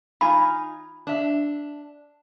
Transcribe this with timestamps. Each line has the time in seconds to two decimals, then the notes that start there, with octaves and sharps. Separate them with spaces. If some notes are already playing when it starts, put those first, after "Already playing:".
0.21 D#4 F4 G#5 B5
1.07 D4 E5